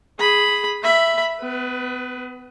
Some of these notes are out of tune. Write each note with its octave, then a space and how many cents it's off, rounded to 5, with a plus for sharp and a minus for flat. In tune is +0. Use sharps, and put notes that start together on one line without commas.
G#4 +0 B5 +0
E5 +10 B5 +0
B3 +35 B4 +0